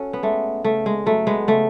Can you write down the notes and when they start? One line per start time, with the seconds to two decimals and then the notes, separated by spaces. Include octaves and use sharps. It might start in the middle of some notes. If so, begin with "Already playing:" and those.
Already playing: C#4 F#4 A4
0.13 B3
0.23 G#3 A3
0.64 C#3 A3
0.86 G#3
1.06 F#3 A3
1.27 G#3 B3
1.48 C#3 A3